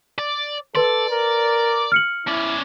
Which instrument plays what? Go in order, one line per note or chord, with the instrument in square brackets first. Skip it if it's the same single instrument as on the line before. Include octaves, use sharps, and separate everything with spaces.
[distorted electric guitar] D5
[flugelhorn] A4 [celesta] B4 C6 [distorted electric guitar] D5
[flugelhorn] A#4
[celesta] F6 C#7 F#7
[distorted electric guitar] C#4 D5 [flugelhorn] E4